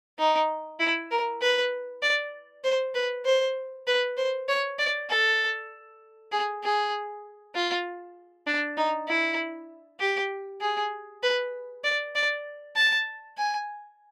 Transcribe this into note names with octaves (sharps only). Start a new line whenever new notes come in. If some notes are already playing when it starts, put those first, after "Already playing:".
D#4
E4
A#4
B4
D5
C5
B4
C5
B4
C5
C#5
D5
A4
G#4
G#4
F4
D4
D#4
E4
G4
G#4
B4
D5
D5
A5
G#5